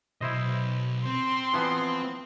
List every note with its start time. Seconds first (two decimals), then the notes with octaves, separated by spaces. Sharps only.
0.21 B1 E4 C5 D#5
1.06 C4 C6
1.53 E3 F3 B3